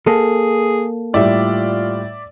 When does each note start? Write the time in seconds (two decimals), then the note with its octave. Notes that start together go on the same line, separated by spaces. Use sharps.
0.07 A#3 G#4 A4
1.14 A2 G3 F4 D5 E5